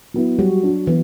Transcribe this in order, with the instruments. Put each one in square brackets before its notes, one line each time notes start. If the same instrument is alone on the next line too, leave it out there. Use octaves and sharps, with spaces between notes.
[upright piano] F#3 B3 E4
[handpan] F#3 F#4 [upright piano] G3
[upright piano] D4 F#4
[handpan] E3 [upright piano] B3